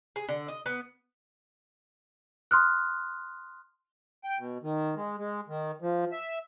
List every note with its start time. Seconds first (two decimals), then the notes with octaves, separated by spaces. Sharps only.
0.16 G#4
0.28 D3
0.48 D#5
0.66 B3
2.51 C6 D#6 F6 F#6
4.24 G5
4.39 B2
4.63 D#3
4.96 G#3
5.19 G#3
5.48 D#3
5.82 F3
6.12 E5